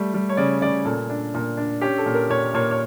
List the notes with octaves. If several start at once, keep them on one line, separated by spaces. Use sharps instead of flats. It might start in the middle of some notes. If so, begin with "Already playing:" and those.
Already playing: G3 A3
G3
C#5
C#3 D5
C#3 D5
A#2 A4
D4
A#2
D4
C#4 G4
A4
A#2
A#4
A#2 C#5
A#2 C#5
C#5